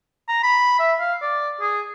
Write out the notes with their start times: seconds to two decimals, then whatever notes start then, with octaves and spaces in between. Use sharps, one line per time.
0.28 A#5
0.43 B5
0.79 E5
1.00 F5
1.22 D5
1.61 G#4